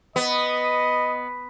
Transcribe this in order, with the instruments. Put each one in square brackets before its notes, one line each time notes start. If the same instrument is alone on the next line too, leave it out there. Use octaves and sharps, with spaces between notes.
[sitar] B3 [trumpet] D#5